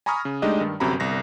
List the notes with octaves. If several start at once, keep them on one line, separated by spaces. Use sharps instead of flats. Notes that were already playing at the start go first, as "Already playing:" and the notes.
G#5 A#5 B5 C#6 D#6 F6
C#3
G#3 A3 D4 D#4 G4 D#5
G2 D#3
G1 F#2 C3 F#4 A#5 B5
G1 C2 A#6